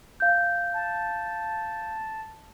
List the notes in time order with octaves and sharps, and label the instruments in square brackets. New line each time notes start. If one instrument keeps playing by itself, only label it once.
[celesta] F5 G6
[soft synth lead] A5